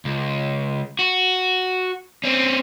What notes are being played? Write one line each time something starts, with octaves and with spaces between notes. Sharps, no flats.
C#2
F#4
C4 C#4